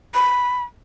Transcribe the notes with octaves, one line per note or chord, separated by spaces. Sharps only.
B5